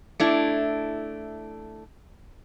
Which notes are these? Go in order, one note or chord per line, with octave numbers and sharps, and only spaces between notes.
A3 D4 E4